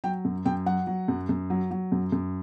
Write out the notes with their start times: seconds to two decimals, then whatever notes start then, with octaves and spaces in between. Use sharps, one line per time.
0.04 F#3 G5
0.25 F#2
0.45 F#2 G5
0.66 F#3 F#5
0.87 F#3
1.08 F#2
1.29 F#2
1.50 F#3
1.71 F#3
1.92 F#2
2.12 F#2